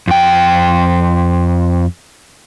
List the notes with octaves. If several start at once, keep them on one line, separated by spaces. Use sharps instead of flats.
F2 G5